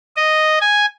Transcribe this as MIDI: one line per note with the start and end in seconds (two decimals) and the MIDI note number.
0.16 0.59 75
0.60 0.85 80